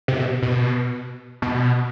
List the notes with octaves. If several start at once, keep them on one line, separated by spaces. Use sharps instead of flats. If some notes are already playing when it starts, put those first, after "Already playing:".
C3
B2
B2
B2